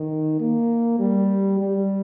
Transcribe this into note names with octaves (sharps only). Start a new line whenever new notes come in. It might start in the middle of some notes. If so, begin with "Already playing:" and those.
Already playing: D#3
A#3
G3
G3